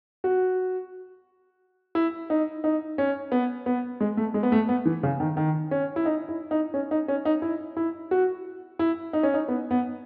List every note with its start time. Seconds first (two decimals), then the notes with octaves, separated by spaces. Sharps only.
0.24 F#4
1.95 E4
2.30 D#4
2.64 D#4
2.98 C#4
3.32 B3
3.66 B3
4.01 G#3
4.17 A3
4.34 G#3
4.43 B3
4.52 A3
4.69 B3
4.85 E3
5.03 C#3
5.20 D#3
5.37 D#3
5.71 C#4
5.96 E4
6.06 D#4
6.29 E4
6.51 D#4
6.74 C#4
6.91 D#4
7.08 C#4
7.25 D#4
7.42 E4
7.77 E4
8.11 F#4
8.79 E4
9.13 D#4
9.23 C#4
9.34 D#4
9.48 B3
9.71 B3